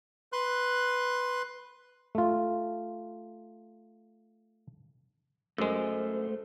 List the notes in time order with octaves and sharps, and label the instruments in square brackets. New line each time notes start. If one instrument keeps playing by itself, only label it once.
[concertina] B4 C6 F#6
[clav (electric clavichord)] A3 F4
[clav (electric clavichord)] F#2 G#3 [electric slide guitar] A3 C5